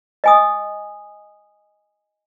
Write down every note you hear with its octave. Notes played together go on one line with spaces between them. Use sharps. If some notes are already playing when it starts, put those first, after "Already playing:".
D#5 G#5 D#6